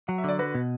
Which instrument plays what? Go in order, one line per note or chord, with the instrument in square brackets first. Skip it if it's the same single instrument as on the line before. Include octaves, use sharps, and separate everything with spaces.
[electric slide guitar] F#3 [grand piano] F#5
[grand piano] E5
[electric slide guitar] D3 [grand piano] D5
[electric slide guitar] F#4 [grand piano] B4
[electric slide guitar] B2